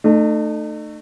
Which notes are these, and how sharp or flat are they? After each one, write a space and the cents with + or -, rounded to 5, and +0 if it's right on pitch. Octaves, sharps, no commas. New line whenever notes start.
A3 +10 D#4 -40